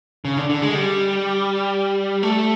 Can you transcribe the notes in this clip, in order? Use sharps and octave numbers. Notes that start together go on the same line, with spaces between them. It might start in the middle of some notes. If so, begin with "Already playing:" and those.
C#3
D3
D3
G#3
G3
A3